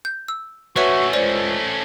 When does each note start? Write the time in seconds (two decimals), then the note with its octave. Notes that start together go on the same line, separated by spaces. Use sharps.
0.05 G6
0.28 E6
0.76 A3 C#4 F#4 B4 C#5 E5
1.13 C#2 C5 D5